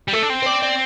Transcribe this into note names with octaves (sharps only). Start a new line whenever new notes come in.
G3
A3 A4
D4
C4
C5
D5
D5